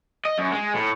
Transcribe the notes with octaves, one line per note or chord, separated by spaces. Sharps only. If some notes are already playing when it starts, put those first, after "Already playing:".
D#5
F#2
G#3
A2